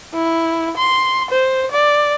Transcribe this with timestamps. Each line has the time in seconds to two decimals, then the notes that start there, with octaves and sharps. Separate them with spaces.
0.14 E4
0.77 C6
1.31 C5
1.72 D5